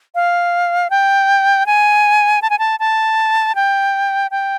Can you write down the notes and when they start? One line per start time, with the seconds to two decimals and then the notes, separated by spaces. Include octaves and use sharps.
0.15 F5
0.90 G5
1.66 G#5
2.42 A5
2.50 G#5
2.59 A5
2.80 A5
3.55 G5
4.31 G5